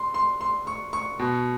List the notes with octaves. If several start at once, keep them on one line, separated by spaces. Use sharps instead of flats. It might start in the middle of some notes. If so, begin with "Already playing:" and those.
Already playing: C6
C6
C6
C#6
C#6
B2